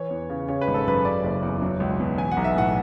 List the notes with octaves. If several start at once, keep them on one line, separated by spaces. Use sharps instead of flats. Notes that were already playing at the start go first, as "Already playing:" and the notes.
Already playing: E3 C#5
E2
C#3
C#3 C#5
B4
G#1
A4
F#2 B4
C#3 D5
F#1
E2
F#3
C#2
B2
E3 G#5
F#5
B1
E5
A2 F#5